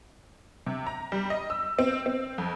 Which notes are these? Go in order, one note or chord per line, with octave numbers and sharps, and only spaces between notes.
C3
A#5
G3
D#5
E6
C4
C4
F2